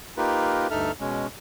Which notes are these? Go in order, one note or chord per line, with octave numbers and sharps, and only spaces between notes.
A#3 D#4 F4 G4 A#4 B4
D2 G2 D#4 A4 E5 F6
B2 G#3 C#4